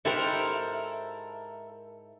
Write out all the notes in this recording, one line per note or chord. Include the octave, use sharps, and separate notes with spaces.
G#2 E4 G4 A4 A#4 C5